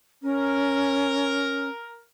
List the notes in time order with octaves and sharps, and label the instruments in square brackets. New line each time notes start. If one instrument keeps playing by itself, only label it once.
[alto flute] C#4 [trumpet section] A#4